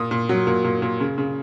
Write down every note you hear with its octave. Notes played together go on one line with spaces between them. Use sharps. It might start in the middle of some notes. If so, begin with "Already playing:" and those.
Already playing: A#2 D#6
A#2
F#3
A#2
A#2
A#2
C#3
C#3